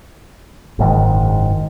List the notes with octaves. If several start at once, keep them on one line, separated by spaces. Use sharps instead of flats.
F#1 G#2 D#3